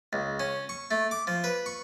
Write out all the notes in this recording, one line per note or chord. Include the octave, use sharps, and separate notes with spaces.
C#2
C#4
C#6
A3
D6
F3
B4
C#6